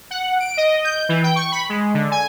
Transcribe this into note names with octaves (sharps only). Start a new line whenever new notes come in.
F#5
D7
D#5
G6
E3
G5
C#6
B5
G#3
D3
G#5